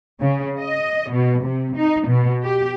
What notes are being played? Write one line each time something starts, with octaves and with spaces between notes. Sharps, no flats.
C#3
D#5
B2
C3
D#4
B2
G4